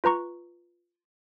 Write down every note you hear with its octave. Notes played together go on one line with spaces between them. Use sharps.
F4 B4 A#5 C#6